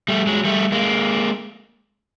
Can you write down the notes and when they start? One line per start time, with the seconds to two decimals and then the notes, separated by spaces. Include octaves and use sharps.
0.08 G3 A3
0.27 F#3 G#3
0.45 G3 A3
0.72 G#3 A#3